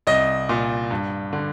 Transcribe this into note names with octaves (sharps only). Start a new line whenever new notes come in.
C2 D#5
A#2
G2
D3